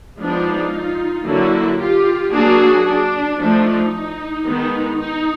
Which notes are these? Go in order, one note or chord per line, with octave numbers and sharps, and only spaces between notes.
F3 G#3 B3 D4 D#4 F4
D3 F#3 A#3 E4 F#4
F4 G4
F#3 A#3 D4 F#4 G#4
D4
F3 A3 D4 D#4
D#3 G#3 B3
D#4